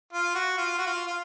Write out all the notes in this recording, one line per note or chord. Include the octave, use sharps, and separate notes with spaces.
F4
F#4
F4
F#4
F4
F4